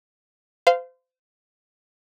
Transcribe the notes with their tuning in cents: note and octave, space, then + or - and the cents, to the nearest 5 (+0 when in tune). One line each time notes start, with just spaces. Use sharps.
C5 -30 F5 -10